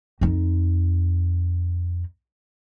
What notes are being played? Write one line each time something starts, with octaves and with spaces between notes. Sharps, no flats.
F2 D#4